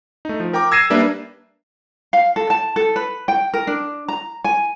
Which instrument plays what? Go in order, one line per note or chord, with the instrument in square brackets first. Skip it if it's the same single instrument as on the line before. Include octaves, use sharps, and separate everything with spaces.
[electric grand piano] A3 D#4
F3
A#4 G5 A#5 D6
E6 G#6 A#6 C7 D#7 E7
G3 A#3 D4 B4 E5
[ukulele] F5
A4
A5
A4
B4
G5
A#4
D4
A#5
G#5